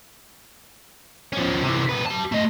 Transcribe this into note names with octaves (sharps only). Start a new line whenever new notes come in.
F3 C#4
C3 E3
A#2 B4
G4 A5
A3 D#5